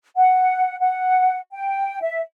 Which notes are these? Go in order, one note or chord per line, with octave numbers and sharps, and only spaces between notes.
F#5
F#5
G5
E5